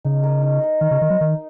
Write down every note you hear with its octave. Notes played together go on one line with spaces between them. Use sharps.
C#3 D#4
A#4 D#5
D#4
A#4 D#5
D#3 D#4
C#3
D#3 A#4 D#5
F#3
D#3 D#4